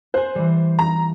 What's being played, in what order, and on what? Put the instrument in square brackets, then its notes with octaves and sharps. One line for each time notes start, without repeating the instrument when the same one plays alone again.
[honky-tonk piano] C5 [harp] G#5 F#6
[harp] E3 G3
[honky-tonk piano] A#5